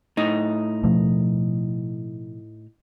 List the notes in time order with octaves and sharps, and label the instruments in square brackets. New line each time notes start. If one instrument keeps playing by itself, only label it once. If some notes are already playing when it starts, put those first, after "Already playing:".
[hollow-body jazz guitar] A2 D#4
[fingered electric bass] B2 F3 A3